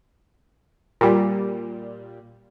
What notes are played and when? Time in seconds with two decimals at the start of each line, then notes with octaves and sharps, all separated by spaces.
1.01 A#2 G3